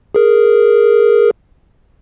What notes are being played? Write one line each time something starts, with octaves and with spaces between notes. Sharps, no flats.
G#4 A#4